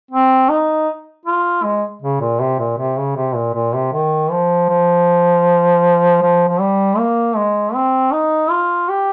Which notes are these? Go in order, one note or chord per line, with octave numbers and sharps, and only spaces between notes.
C4
D#4
F4
G#3
C#3
A#2
C3
A#2
C3
C#3
C3
A#2
A#2
C3
D#3
F3
F3
F3
F3
G3
A#3
G#3
C4
D#4
F4
G4